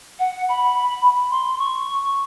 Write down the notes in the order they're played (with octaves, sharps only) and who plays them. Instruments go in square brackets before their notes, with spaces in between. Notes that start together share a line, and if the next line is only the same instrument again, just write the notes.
[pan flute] F#5
B5
C6
C#6